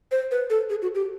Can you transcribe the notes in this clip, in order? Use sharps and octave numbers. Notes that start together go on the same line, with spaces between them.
C5
B4
A4
G#4
F#4
G4